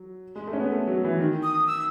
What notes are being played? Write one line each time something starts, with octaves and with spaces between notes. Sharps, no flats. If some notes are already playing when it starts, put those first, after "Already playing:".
Already playing: F#3
G#3
A3
C#4
B3
A3
F#3
E3
D#3
D#6
E6